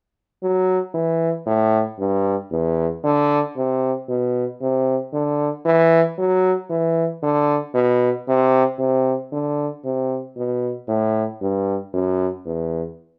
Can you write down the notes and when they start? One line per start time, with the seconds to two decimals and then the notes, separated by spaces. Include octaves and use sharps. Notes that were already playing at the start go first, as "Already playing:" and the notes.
0.43 F#3
0.94 E3
1.46 A2
1.99 G2
2.51 E2
3.04 D3
3.57 C3
4.09 B2
4.61 C3
5.13 D3
5.65 E3
6.18 F#3
6.70 E3
7.23 D3
7.74 B2
8.28 C3
8.79 C3
9.32 D3
9.85 C3
10.37 B2
10.88 A2
11.41 G2
11.94 F#2
12.46 E2